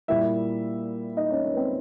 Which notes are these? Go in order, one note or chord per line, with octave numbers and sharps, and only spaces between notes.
A#2 G3 A#3 E4 E5
D#4 D#5
C#4 C#5
C#4 C#5
B4
C4 C5